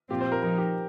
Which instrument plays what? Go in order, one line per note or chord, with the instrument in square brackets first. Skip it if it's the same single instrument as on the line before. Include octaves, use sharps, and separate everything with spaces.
[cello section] A#2 F3 C4 F4 [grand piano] G4
[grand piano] C5
A#4
[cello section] F3 D#4 [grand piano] A#4
[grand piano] G4